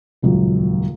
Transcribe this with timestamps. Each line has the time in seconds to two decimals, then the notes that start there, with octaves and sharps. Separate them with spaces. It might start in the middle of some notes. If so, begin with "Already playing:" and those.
0.22 D#1 C#2 F#2